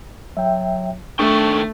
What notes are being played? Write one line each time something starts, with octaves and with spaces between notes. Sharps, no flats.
F#3 E5 G5
D#3 A3 D4 A4 G5 C#6